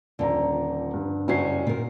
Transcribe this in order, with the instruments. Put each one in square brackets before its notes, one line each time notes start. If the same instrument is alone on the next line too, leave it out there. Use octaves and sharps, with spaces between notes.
[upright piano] D#1 A#5 [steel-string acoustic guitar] D3 F3
[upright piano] G2
[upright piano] F#1 F#4 C7 [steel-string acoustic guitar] G3 C#4
[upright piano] A#2 [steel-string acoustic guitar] D#3 A#4